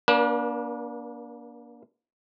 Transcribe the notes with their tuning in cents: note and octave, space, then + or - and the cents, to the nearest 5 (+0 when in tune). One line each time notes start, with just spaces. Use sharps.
A#3 +30 D4 -20 B4 -40